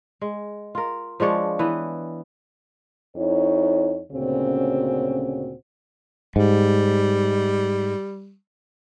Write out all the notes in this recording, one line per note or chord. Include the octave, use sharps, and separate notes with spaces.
G#3
F4 A#4
F3 G#3 D4 C#5
E3 B3
F2 D#4 E4 C#5
D2 A#2 C#3 C4 C#4 F#4
G#2 G3